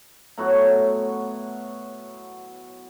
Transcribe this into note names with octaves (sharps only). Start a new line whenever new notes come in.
A2 F#3 B3 F#4